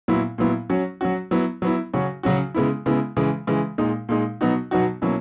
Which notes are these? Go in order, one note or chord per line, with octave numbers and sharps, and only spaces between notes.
A#2 F#3 B3 E4
A#2 F#3 B3 E4
F#3 C#4 F#4
F#3 C#4 F#4
F#3 B3 E4
F#3 B3 E4
C#3 F#3 C#4 F#4
C#3 F#3 C#4 F#4
C#3 G#3 B3 E4
C#3 G#3 B3 E4
C#3 E3 G#3
C#3 E3 G#3
A#2 G#3 D#4
A#2 G#3 D#4
B2 F#3 B3 D#4 F#4
B2 F#3 B3 D#4 F#4
B2 F#3 A#3 C#4 E4